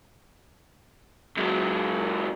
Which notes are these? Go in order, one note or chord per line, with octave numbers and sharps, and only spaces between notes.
C#2 F#3